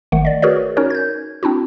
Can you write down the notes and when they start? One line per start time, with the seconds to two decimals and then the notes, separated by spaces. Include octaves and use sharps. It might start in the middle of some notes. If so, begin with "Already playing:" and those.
0.12 G#1 D#3 A3 F#5
0.25 D5 D#5
0.42 F#4 G#4 A#4 B4 C#5 D5
0.77 C#4 D#4 F#4 A#4 C#5
0.90 G6 G#6
1.43 C4 D4 E4 F#4